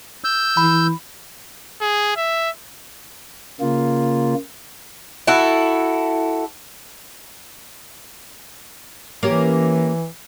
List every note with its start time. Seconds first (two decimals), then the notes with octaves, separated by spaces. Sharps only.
0.24 E6 G6
0.57 E3 B5
1.81 G#4
2.16 E5
3.60 C#3 A#3 F4
5.27 E4 F#4 A4
9.23 E3 A#3 C#4 G4